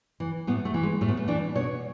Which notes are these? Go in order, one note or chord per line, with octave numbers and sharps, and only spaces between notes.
E3
A2 B3
A3
E3
G#3
A2 A3
B3
A3
E3 D4
B2 C#5